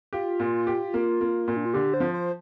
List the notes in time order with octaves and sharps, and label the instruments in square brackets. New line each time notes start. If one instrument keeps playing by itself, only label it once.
[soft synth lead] F4 [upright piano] G4
[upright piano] A#2
G4
A#3
A#3
A#2
[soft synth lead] D4
F4
[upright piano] D3 [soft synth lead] G4
[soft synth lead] C5
[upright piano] F3
[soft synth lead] C5